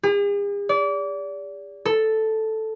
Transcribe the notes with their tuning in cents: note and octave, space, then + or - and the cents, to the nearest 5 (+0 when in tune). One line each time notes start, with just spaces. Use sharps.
G#4 -45
D5 -30
A4 +0